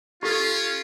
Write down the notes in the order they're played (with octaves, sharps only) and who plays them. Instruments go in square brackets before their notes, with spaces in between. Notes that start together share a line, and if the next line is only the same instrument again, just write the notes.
[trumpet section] C#4 F4 [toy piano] G4 A4